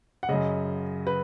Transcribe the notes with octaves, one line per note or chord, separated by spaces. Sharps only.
F#5
F#2 C#3 D#5
B4